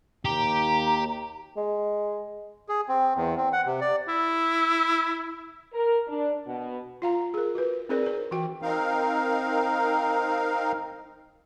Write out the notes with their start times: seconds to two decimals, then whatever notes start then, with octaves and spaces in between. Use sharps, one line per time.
0.25 D#2 G4 A#5
1.57 G#3
2.69 G#4
2.89 C4
3.16 E2
3.37 C4
3.53 F#5
3.66 C3
3.81 D5
4.08 E4
5.74 A#4
6.08 D4
6.47 B2
7.02 F4 F5 A#5
7.34 G#4 A#4
7.55 F#4 B4
7.89 C4 D#4 G#4 A#4 C5 D5
8.03 G#4 C5
8.31 E3 F#4 G5
8.62 C4 D#4 A#4 F5